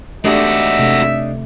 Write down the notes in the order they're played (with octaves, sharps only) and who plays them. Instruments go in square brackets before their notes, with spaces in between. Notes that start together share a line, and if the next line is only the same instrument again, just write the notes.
[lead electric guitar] G#3 F#4 [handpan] A3 G4 [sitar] D4 D#4 [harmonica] E5
[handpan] C3 A3